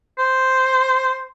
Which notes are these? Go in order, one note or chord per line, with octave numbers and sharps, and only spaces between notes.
C5